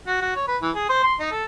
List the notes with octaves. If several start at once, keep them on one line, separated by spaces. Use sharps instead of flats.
F#4
F#4
C#5
B4
E3
G#4
C5
C6
D#4
A4